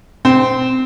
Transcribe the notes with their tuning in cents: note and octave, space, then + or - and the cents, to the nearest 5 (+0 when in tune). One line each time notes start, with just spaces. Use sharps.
C4 -15